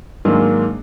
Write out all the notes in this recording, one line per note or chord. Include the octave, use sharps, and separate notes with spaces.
G#2 D#3 F#3 G#3 A#3 D4